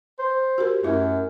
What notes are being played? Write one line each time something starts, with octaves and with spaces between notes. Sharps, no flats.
C5
F#4 G4 A#4
F#2 A3 E4 A#4